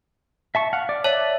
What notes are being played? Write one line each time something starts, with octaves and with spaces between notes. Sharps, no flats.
E5 A5 C#6
F5 F#5
D5
C#5 D5 E5 A5